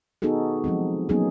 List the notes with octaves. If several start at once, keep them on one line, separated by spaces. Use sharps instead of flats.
B3 D#4 F#4 G#4 A4
F3 F#3 G#3 C4
F#3 A#3 B3 C#4 D#4 G#4